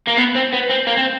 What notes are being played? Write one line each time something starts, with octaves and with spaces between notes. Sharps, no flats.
A#3
B3
C4
B3
C4
A#3
C4